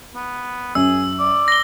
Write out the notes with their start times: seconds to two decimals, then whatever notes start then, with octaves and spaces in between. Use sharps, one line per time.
0.15 B3
0.75 F#2 G#4 E6
1.19 D5
1.48 A#6 G7